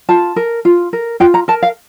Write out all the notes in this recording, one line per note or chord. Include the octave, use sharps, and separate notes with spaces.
F4 A5
A#4
F4
A#4
F4 G5
A#5
A#4 A5
F5